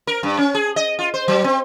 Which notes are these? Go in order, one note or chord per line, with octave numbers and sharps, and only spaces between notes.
A#4
G2
C#4
G#4
D#5
F4
C5
F#3
C4